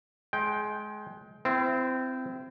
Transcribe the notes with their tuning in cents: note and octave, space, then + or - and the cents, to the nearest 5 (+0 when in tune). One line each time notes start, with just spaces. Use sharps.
G#3 +25 G5 +0
C4 -15 E4 +35